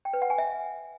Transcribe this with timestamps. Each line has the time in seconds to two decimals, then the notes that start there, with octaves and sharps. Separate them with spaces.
0.05 G5
0.14 B4
0.22 F#5
0.30 G#5
0.38 E5